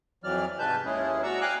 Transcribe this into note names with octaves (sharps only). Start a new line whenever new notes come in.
F2 E3 F#3 D5 F6
G#2 C3 G#3 B4 A5 G6
D#2 G#3 C#4 E4 G#4
F#4 D5 A#5 C#6 E6
F5 G5 G#5 A#5 D6 F#6